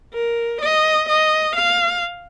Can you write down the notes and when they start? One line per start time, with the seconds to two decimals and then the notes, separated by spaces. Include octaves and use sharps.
0.13 A#4
0.61 D#5
1.09 D#5
1.56 F5